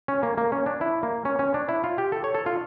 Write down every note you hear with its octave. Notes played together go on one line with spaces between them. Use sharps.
C#4
A#3
A#3
C#4
D4
E4
A#3
C#4
C#4
D4
E4
F4
G4
A4
C#5
A4
F4